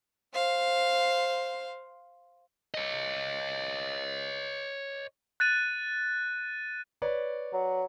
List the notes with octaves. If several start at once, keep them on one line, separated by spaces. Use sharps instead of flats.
C5 F5
C#5 D#5
F#6 A6 D#7
B4 C#5 D5
F#3